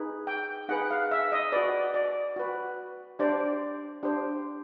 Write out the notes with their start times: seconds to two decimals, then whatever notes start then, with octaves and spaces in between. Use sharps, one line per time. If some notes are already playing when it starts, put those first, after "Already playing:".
Already playing: D#4 G#4 B4
0.27 G5
0.69 D#4 G#4 B4 F#5
0.91 F5
1.11 E5
1.32 D#5
1.52 F#4 B4 D5
1.94 D5
2.36 F#4 B4
3.19 D4 G4 C5 D5
4.03 D4 G4 C5